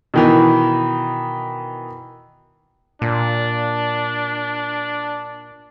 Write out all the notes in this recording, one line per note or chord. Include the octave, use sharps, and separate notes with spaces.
B2 D#3 E3
A#2 D4